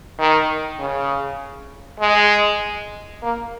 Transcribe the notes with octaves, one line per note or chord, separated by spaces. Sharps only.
D#3
C#3
G#3
A#3